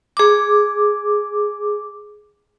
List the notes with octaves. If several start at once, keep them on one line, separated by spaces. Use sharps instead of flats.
G#4 D6